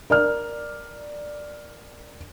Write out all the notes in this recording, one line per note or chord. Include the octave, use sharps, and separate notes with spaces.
A#4 D5 F6